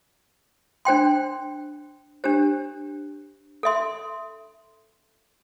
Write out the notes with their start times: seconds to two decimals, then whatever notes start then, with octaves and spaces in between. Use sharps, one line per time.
0.85 D4 C5 G5 C6
2.24 D4 G4 C5
3.63 A4 E5 C6